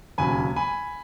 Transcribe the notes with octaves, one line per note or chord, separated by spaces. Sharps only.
E1 D#2 C#3 F#3 G#5 B5
G#5 B5